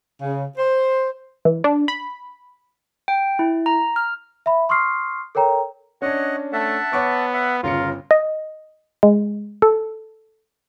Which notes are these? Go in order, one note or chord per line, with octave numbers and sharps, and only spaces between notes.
C#3
C5
E3
D4
B5
G5
E4
A#5
F6
E5 B5
C6 C#6 D#6 F6 C7
A4 A#4 C#5 G5 A#5
C#4 D4 C#5 D#5 F#5
A3 E5 F#5 A5
B3 C#5 C#6 D6
E5 F#5
G1 C#3 F4 A#4 C#7
D#5
G#3
A4